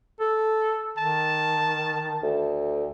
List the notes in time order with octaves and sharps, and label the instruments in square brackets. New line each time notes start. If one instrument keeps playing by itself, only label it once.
[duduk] A4
[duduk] D#3 [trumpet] A5
[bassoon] D2